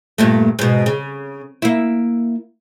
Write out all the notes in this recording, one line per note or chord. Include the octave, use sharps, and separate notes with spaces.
G2 A#2 A3
G#2 B2
C#3
A#3 E4